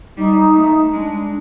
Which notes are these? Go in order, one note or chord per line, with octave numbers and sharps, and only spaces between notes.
G3 D#4
A3
G#3 D4